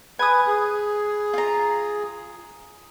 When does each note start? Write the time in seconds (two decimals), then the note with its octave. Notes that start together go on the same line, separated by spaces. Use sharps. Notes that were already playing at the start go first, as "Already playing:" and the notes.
0.19 B4 G#5 D#6
0.47 G#4
1.34 F4 A#5